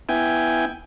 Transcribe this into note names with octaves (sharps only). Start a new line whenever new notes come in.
B3 E4 G5 G#5